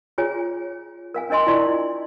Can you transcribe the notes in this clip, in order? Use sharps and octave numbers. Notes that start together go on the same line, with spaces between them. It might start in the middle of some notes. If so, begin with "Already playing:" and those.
F4 G#4 C#5 G#5
A#4 F5 G#5
D4 A#4 D#5 G#5 C6
E4 F4 D5 C6 C#6